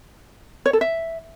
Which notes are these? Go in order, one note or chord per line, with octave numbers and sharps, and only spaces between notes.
C#5
A4
E5